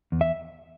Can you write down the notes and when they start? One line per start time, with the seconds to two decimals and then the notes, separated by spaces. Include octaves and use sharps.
0.12 E2
0.21 E5